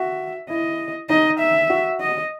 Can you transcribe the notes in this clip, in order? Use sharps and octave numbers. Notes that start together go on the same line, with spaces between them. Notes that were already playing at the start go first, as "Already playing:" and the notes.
Already playing: F#4 E5
E4 D#5
D#4 D#5
E5
F#4
D#5